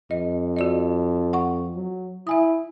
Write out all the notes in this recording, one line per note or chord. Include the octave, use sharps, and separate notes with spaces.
F2 D#5
F#4 D5 D#5
F#5 C#6
F#3
E4 E5 G#5 D#6